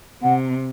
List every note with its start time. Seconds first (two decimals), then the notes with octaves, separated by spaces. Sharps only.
0.22 C3 F#5